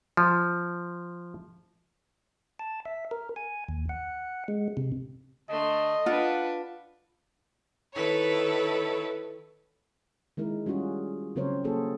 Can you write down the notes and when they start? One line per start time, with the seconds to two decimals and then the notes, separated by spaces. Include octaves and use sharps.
0.17 F3
2.59 A5
2.85 E5
3.11 A#4
3.36 G#5
3.69 D#2
3.89 F#5
4.48 G#3
4.77 C3
5.50 D3 A3 D#5 C6
6.06 D4 F4 B4 F#5
7.93 D#3 E4 A4 B4 C#5
10.37 D#3 G#3 E4 A#4
10.66 G3 C#4 F4 F#4 G#4
11.36 C#3 F#3 C4 A#4 C5 C#5
11.64 A#3 F#4 G#4 A4